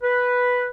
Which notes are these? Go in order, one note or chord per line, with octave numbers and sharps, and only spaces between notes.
B4